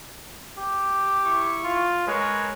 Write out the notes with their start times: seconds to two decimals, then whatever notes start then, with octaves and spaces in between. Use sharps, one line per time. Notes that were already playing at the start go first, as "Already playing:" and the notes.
0.58 G4
1.25 E4 C#6
1.64 F4
2.07 G#3 A#4 B4 C#5